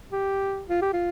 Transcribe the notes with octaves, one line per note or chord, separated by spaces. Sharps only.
G4
F4
G4
F4